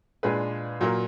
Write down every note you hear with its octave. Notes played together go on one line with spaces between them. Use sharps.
A#2 G#3 D4 G#4 B4
A#2 F#3 A#3